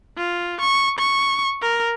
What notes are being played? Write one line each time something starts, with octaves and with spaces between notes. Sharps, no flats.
F4
C#6
C#6
A#4